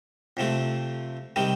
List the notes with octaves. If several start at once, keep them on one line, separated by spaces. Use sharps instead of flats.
F2 C3 F3 A3
C3 D#3 G3